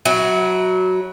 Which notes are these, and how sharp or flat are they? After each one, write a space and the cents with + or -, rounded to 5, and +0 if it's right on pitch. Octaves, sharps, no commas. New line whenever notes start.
F#3 +0 E4 -30